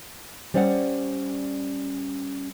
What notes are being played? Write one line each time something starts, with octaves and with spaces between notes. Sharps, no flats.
G3 C#4 C5 D5 E5 F#5